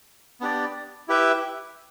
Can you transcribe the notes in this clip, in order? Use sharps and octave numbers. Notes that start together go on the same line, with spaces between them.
B3 D4 G4 D5
E4 G4 B4 E5